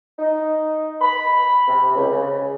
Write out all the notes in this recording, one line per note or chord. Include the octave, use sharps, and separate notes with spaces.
D#4
B5
C3
C#2
C#3